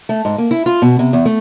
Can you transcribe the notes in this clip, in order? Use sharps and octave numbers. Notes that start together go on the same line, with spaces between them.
A3
G#2
A#3
E4
F4
B2
C3
E2
A3